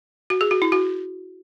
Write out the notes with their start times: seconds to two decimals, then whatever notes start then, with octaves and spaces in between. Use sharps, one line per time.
0.30 F#4
0.41 G#4
0.51 F#4
0.62 E4
0.72 F#4